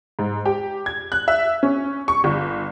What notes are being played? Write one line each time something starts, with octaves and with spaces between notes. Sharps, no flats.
G#2
G4
G#6
F#6
E5
C#4
C#6
G1